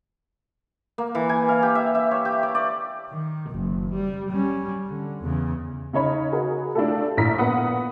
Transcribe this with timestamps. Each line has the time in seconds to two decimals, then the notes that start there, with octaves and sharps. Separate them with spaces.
0.98 A#3
1.15 E3
1.29 G#5
1.49 F5
1.63 G4
1.75 E5
1.95 E5
2.11 C#5
2.25 G4
2.43 D5
2.55 D5
3.10 D#3
3.51 F#1
3.93 G3
4.31 G3 C#4
4.86 D3
5.23 E2 C#3
5.93 C#3 D#4 C#5 B5
6.32 F#4 G#4 A#4 B4
6.75 A3 D4 E4 F4 G4 A4
7.17 A#1 A2 E4 A#5 B6
7.38 A#2 B3 B4 F#5 D#6